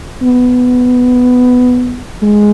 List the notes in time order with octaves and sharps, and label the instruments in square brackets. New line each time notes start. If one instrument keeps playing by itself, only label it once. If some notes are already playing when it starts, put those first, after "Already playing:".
[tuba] B3
G#3